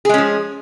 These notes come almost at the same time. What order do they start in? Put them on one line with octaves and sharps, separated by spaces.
G#4 G#3 C#4 F3